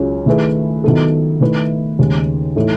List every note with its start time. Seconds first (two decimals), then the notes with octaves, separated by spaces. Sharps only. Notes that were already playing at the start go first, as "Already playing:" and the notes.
Already playing: C#2 C#3 F#3 C#4
0.26 D#3 A3 E4 G#4 B4
0.84 D#3 F#3 B3 E4 A4
1.41 D#3 A3 E4 B4
1.99 D#2 C#3 G#3
2.56 A2 E3 A3 D#4 A4